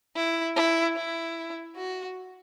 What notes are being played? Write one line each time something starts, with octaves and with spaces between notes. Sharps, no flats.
E4
E4
E4
F#4